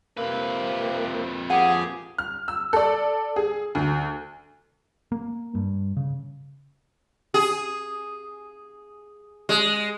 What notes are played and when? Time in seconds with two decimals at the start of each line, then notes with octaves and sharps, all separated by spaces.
0.17 F2 C3 A#3 B4
1.50 F3 A#3 G4 G#4 F#5
2.18 F6
2.48 E6
2.73 A4 D5
3.36 G#4
3.75 D2
5.12 A#3
5.55 G2
5.97 C#3
7.34 G#4
9.49 G#3